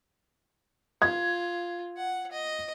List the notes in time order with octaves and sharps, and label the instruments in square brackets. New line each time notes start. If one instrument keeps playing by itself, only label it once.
[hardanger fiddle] F4 [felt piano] G#6
[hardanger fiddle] F#5
D#5